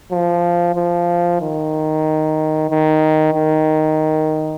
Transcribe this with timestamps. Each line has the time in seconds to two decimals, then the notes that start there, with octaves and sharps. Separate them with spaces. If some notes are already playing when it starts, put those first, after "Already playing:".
0.12 F3
0.75 F3
1.41 D#3
2.70 D#3
3.34 D#3